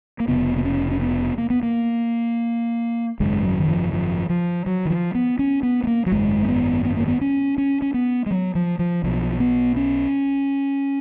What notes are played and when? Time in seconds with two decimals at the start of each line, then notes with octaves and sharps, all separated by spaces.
0.20 A#3
0.28 F1 F2 C#3 B3
0.58 B3
0.65 C#4
0.91 C#4
1.01 B3
1.38 A#3
1.50 B3
1.63 A#3
3.20 G#1 F#2 C#3 G#3
3.44 F#3
3.60 D#3
3.68 F3
3.93 F3
4.30 F3
4.66 F#3
4.85 D#3
4.90 F3
5.15 B3
5.39 C#4
5.63 B3
5.84 B3
5.87 A#3
6.06 F#3
6.12 G#1 F#2 C#3 G#3
6.43 A#3
6.48 B3
6.85 B3
6.96 A#3
7.08 B3
7.21 C#4
7.58 C#4
7.82 C#4
7.94 B3
8.26 G#3
8.31 F#3
8.55 F3
8.79 F3
9.03 B1 B2 F3
9.40 B3
9.76 C#4